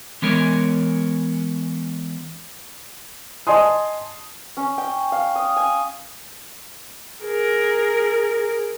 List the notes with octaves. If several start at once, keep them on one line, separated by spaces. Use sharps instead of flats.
E3 G#3 B3 C#4 A#4 C#5
D#5 G#5 A5 C6 D#6
C#4
G5
F5
D#6
G#5
G#4 A#4